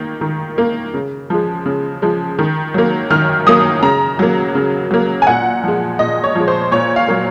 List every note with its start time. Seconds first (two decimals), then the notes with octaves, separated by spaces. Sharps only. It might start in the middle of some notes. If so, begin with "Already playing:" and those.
Already playing: D#3 A#3
0.21 D#3
0.58 A#3
0.94 C#3
1.30 F3 G#3
1.65 C#3
2.02 F3 G#3
2.39 D#3
2.74 F#3 A#3
3.10 D#3 F6
3.47 F#3 A#3 D#6
3.82 C#3 A#5
4.19 F#3 A#3
4.55 C#3
4.91 F#3 A#3
5.22 G#5
5.27 A#2 F#5
5.64 F3 G#3
5.99 A#2 D#5
6.24 C#5
6.35 F3 G#3
6.48 C5
6.71 A#2 C#5
6.96 F5
7.08 F#3 A#3